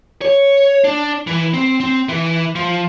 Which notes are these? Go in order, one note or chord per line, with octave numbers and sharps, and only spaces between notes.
C#5
D4
E3
C4
C4
E3
F3